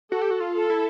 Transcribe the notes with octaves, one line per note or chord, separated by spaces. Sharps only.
F#4 A4
G4
F#4
F4
A4
E4